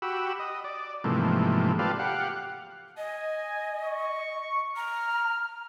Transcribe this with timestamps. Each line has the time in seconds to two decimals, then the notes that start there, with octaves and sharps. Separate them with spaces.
0.02 F#4 G4 B5 E6
0.39 D#5
0.64 D5
1.04 G#2 C3 E3 F3 A3 A#3
1.79 F4 G4 A4 B4 D5 F5
1.99 G4 F5 F#5
2.98 D#5 G#5
3.84 C#6
4.76 A#5 F6